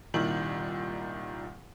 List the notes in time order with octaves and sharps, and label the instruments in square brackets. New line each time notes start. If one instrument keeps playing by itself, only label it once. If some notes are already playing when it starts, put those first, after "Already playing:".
[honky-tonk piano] C2 A#2 D#3 E4 F#7